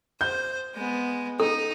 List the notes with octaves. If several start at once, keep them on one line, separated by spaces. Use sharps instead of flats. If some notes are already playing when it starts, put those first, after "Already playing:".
C5 G6
G#3 B3
D#4 A4